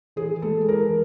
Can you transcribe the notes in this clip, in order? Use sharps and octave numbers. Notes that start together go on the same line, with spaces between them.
E3 G#4
G#3 A4
E3 A#4